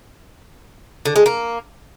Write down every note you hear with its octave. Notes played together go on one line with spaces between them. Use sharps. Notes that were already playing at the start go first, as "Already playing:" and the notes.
D3
G#3
A#3